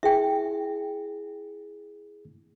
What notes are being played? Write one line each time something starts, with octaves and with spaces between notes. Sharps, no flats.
E4 G#4 E5 G5